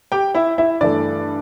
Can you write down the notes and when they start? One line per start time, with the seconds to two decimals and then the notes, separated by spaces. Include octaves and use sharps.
0.12 G4 G5
0.35 E4 E5
0.58 E4 E5
0.81 G2 E3 A3 D5